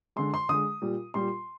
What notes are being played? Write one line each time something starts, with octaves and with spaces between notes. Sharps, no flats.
D3 G#3 C6
C6
D3 G#3 D#6
A#2 G3
A#2 G3 C6